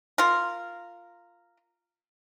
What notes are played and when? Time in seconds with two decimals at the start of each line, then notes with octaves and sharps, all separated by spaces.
0.18 F4 A#4